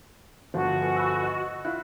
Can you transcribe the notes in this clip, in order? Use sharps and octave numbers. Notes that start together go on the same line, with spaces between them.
G1 F3 F#4 A#4 C5
A4 B4 G#5
B5 C#6 E6
D#5
E4 F4 F#6